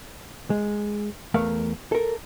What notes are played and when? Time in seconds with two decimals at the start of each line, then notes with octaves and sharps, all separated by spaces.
0.50 G#3
1.34 E2 A3 A#4 F5
1.92 A4 A#4